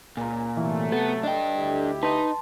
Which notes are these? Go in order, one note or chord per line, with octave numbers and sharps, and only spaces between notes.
C#2 A#2 G#5 A#5
C3 E3 F#3 A3
B3 A4
D4 D#5 G5
D2 E4 G4
D#4 B4 D#5 A5 C6